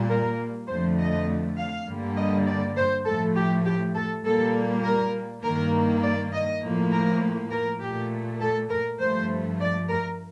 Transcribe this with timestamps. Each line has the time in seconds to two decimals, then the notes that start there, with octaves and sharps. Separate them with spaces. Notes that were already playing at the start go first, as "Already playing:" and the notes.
Already playing: A#2 G3 A#3
0.08 A#4
0.68 F2 D3 F3 A3 C5
0.98 D#5
1.57 F5
1.86 G2 D3 G3 A#3
2.17 D#5
2.46 D5
2.76 C5
3.06 A2 F3 A3 A4
3.35 G4
3.65 G4
3.95 A4
4.24 A#2 G3 A#3 A4
4.83 A#4
5.43 G2 D#3 A#3 A#4
6.02 D5
6.33 D#5
6.62 A2 F3 A#3
6.91 A#4
7.51 A#4
7.80 A#2 A3 G4
8.41 A4
8.70 A#4
8.99 G2 F3 A3 C5
9.60 D5
9.89 A#4